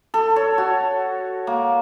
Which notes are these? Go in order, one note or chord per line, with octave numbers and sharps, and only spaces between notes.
A4
C#5
F#4
A#3